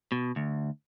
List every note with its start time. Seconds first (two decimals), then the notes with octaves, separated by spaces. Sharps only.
0.12 B2
0.36 D2